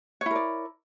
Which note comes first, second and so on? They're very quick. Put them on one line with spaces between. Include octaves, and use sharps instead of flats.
C#5 E4 A#4 D5